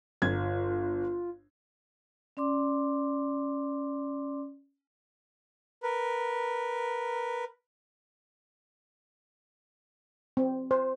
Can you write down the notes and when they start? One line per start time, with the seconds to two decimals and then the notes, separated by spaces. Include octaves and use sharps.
0.22 G1 F4 G#6
2.37 C#4 D5 C6 D6
5.83 A#4 B4
10.37 C4
10.71 C5